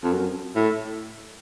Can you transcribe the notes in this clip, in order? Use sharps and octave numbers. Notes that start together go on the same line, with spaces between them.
F2
F#2
A2